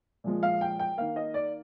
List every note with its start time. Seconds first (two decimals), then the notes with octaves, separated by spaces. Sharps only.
0.24 A#2 F3 G#3
0.43 F5
0.61 G5
0.79 G5
0.97 D#3 A#3 F5
1.16 D#5
1.34 D5